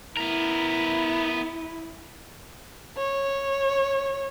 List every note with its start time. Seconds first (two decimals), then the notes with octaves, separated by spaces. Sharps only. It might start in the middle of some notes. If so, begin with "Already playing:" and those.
0.17 B3 E4 A#4
2.97 C#5